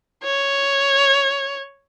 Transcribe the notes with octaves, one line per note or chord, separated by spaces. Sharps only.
C#5